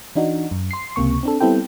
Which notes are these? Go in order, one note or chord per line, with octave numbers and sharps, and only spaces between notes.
E3 D4 D#4 F#4
F#2
C6 C7
C#2 C3 A#3 C#6
C4 D4 A4
G3 B3 C4 E4 A4 G5